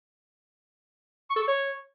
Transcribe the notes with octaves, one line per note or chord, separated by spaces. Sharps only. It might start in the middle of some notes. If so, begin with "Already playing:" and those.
C#6
A4
C#6
C#5